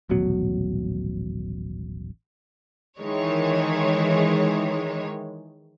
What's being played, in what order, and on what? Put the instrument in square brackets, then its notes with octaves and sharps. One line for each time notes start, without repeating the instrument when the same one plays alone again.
[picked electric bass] D#1 A1 B2 F#3
[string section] D#3 E3 G#3 C#5